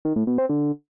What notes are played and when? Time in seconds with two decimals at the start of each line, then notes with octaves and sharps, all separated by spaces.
0.05 D#3
0.16 A2
0.27 B2
0.38 C4
0.49 D3